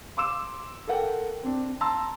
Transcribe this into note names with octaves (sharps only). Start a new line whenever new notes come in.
C6 D6 E6 E7
A4 A#4 F#5 G5
C4 D4
A5 A#5 C6 E6